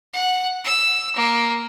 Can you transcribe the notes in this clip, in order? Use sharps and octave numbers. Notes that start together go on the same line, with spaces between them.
F#5
E6
A#3